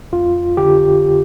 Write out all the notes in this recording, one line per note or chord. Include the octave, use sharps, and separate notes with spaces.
F2 F4
D3 G4